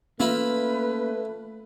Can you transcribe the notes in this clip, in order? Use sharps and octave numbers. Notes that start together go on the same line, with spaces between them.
A3 A#3 C#4 E4 F4 B4 B5